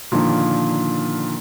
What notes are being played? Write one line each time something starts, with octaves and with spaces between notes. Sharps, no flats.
A#2 D3 D#3 F3